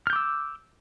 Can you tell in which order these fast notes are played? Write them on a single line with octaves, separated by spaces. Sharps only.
F6 G6 D6 E6